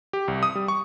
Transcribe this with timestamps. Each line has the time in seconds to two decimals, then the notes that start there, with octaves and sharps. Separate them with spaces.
0.13 G4
0.28 C2
0.43 D#6
0.55 G3
0.68 C#6